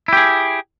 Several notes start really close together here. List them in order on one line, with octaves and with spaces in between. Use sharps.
E4 G4 G#4